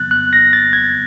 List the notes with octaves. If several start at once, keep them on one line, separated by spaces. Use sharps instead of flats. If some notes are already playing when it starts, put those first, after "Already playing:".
Already playing: F2 C#3 F#3 B3 F#6 A6
F#6
A#6
A6
G#6